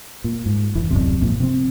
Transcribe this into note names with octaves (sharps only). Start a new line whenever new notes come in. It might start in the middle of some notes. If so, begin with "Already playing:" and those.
A#2
G#2
F1 E3
D1 G#1 F#2 C3
G#1 A#2 F3
C3 C4